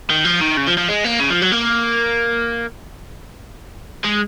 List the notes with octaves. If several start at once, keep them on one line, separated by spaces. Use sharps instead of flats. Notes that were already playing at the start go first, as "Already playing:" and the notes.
D#3
F3
D#3
C#3
F3
F3
G#3
A#3
C#3
F3
F#3
A#3
G#3